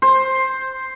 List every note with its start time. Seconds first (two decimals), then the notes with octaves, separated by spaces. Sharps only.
0.02 C5